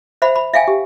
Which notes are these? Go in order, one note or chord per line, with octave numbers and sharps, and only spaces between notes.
C5 E5 F#5 B5
B5
E5 F5 G5 G#5
G4